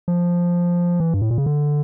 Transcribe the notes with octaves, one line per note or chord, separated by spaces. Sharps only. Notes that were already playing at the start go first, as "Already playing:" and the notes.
F3
E3
G2
A2
A#2
C#3
D3